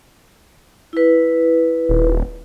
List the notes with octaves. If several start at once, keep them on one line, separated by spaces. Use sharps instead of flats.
E4 B4
D#1